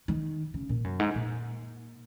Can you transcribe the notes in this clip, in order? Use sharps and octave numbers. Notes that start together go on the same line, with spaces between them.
D#3
C#3
A#2
F#2
G#2
A#2